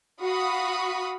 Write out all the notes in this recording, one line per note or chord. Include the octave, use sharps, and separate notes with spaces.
F#4 F5 B5 D#6